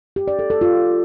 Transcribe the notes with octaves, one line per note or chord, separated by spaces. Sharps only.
G4
D5
A4
A4
F4